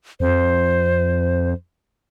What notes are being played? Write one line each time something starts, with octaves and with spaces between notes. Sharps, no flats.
F2 C5